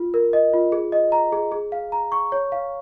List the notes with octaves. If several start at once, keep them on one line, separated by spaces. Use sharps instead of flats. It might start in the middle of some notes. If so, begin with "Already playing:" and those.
Already playing: F4
A#4
D#5
F4
G#4
D#5
A#5
G#4
G#4
F5
A#5
C#6
C#5
F5